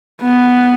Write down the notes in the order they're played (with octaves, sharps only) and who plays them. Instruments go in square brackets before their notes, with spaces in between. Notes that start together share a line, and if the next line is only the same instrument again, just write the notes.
[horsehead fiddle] B3